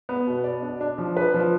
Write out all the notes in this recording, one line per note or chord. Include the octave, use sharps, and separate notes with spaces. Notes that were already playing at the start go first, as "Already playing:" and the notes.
B3
B2
D5
D4
D4
F3
B4
F3